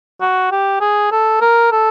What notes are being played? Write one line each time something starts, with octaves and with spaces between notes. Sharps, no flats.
F#4
G4
G#4
A4
A#4
A4